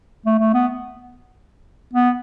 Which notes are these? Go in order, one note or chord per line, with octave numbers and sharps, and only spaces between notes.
A3
A3
B3
B3